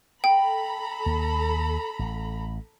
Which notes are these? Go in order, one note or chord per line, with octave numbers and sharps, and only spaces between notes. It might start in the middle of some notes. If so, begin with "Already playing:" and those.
A4 G5 A#5 B5
D#2 A#3
A1